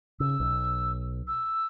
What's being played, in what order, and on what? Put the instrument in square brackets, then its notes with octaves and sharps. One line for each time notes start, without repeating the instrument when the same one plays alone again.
[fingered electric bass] C#3 [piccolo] E6
[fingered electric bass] B1
[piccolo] E6